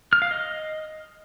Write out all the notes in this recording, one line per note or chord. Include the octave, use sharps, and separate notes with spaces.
F6
F5
D#5